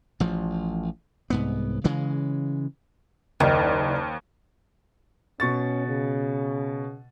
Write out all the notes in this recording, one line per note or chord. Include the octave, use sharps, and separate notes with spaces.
A1 F3
C2 G#2 B3
C#3 E3 G#3
F#1 D#2 D#3 D5 F6
B2 C#4 C#6 A6
C#3